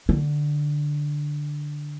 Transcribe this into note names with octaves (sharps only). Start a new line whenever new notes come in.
D3